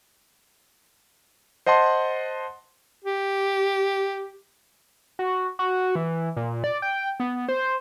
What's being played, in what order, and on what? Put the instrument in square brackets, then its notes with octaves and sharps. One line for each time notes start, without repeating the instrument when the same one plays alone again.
[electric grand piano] C5 D#5 F#5 A5 C6
[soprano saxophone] G4
[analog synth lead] F#4
F#4
E3
A#2
D5
G5
B3
C5